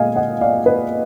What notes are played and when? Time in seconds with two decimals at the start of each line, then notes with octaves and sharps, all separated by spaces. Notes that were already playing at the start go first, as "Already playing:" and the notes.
Already playing: A#2 G#3 D#5 F5 G#5
0.16 D#5 F#5
0.41 D5 F5
0.66 B4 D#5